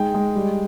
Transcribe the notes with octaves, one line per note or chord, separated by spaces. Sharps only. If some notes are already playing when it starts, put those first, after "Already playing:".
Already playing: G#3 D#4 G5
G#3
G3